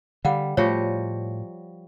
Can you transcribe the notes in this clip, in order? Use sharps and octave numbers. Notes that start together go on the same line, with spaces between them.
D3 G3 F5 F#5
A2 F3 G3 A3 F#4 C#5